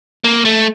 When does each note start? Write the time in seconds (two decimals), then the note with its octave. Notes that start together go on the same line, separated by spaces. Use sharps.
0.24 A#3
0.45 A3